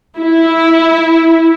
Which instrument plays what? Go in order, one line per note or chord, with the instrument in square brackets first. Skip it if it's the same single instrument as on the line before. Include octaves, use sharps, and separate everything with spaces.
[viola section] E4